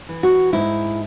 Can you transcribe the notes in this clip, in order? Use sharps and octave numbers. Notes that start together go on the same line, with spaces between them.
E3
F#4
G#2 E4